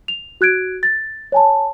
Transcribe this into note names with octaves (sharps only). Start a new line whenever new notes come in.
F7
F#4 F#6 G#6 D7
A6
C#5 G#5 A5